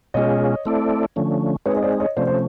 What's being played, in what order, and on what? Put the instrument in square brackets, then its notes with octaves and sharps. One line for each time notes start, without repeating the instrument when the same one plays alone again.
[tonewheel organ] B2 G#3 C#4 F4 G#4 [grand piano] C#5 D#5
[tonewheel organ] A3 C4 E4 A4 D5
D3 F3 A3 C#4
[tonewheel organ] G#3 C4 D#4 G#4 [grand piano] B4 C#5
[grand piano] D#5
C5 D5
C#5 D#5
[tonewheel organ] C3 F3 A3 C#4 [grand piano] C5 D5
[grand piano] C5